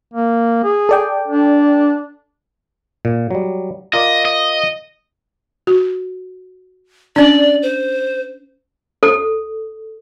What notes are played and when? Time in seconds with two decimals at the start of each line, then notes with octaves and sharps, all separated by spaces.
0.13 A#3
0.64 G#4
0.89 A4 D5 G5
1.28 D4
3.05 A#2
3.31 F#3 G3
3.93 F4 A#4 D5 D#5
4.25 D#5
5.67 F#4
7.16 C#4 D4 D5
7.62 C5
9.03 A4